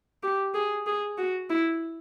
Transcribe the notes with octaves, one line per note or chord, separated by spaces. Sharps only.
G4
G#4
G#4
F#4
E4